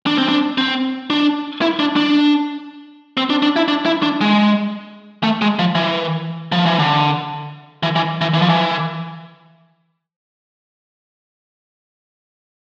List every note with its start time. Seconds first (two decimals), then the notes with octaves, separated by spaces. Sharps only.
0.07 D4
0.18 C4
0.29 D4
0.58 C4
1.10 D4
1.62 E4
1.79 D4
1.96 D4
3.17 C4
3.30 D4
3.43 D4
3.56 E4
3.68 D4
3.86 E4
4.03 D4
4.21 G#3
5.23 A3
5.42 G#3
5.59 F3
5.75 E3
6.52 F3
6.66 E3
6.79 D3
7.83 E3
7.96 E3
8.21 E3
8.34 E3
8.42 F3
8.49 E3